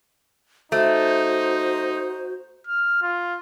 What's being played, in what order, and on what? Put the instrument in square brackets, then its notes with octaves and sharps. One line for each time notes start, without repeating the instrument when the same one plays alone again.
[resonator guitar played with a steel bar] A3 [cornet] D#4 [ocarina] F#4 [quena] C5
[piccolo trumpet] F6
F4